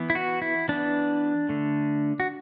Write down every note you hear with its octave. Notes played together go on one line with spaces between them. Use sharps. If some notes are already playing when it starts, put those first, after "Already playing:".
Already playing: E3 B3
E4
F#4
E4
E3 B3 D4
D3 A3
F#4